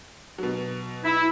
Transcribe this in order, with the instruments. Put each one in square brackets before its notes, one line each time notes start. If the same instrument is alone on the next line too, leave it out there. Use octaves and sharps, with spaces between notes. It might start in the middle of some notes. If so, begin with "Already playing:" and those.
[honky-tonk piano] B2 F#3
[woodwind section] E4